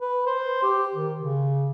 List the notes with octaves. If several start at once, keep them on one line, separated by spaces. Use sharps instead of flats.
B4
C5
G4
D#3
C#3